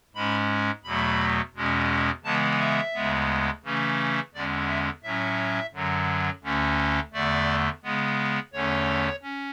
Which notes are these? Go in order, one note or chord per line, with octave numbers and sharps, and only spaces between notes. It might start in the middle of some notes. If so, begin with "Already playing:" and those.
G#2 G#3 C#4 B5
E2 B2 F#3 A3 B5
E2 B2 G#3 C#4
C#3 E3 G#3 B3 A5
E5
D2 C#3 G#3 B3
C#3 E3 A3 C#4
E2 D3 G#3 C#4 D5
E5
A2 F#3 C#4 E5
F#2 D3 F#3
D2 D3 A3 C#4
E2 D3 A3 D5
C#3 G#3 B3
E2 D3 A3 C#4 C#5
C#4